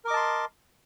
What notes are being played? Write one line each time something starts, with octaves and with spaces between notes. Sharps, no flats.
A#4 D#5 A5 C6 D6